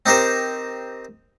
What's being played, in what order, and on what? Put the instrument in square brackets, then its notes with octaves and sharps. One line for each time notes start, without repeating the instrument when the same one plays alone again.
[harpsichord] C4 D#4 G4 A#4 C5